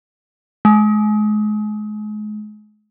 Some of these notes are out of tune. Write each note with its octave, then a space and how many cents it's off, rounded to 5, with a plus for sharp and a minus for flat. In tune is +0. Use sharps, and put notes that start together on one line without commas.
G#3 +35